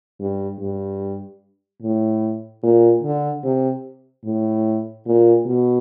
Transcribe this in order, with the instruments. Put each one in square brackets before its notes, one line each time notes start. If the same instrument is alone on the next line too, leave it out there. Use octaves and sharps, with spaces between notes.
[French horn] G2
G2
A2
A#2
D3
C3
A2
A#2
B2